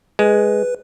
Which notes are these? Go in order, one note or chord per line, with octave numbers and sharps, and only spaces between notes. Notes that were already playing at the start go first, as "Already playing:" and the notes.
G#3 B4